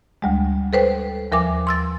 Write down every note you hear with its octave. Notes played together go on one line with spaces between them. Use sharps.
D2 G3 G#3
A4 B4 C5 G5
D#2 F3 A#4 E5 G#5 D6
C6 E6 A6